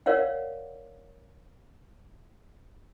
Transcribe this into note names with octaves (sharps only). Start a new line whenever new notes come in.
A#4 C#5 D5 F5 F#5